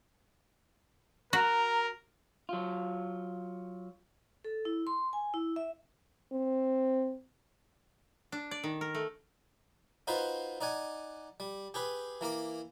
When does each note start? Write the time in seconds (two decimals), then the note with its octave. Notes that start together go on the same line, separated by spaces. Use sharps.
1.33 F#4 A#4 A#5
2.49 F#3 F4
4.44 A4
4.65 E4
4.87 C6
5.13 G#5
5.34 E4
5.56 E5
6.32 C4
8.32 D4
8.51 D5
8.64 D#3
8.81 A#4
8.95 A3
10.07 D#4 F4 F#4 B4 C5 C6
10.61 D#4 D5 F#5 G#5
11.40 G3
11.74 G4 G#4 B4
12.21 E3 A#3 A#4 D6